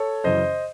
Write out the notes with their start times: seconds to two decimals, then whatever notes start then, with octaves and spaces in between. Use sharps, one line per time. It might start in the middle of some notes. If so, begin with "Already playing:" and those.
Already playing: A4 C#5
0.24 F#2 C#3 E3 C5 D#5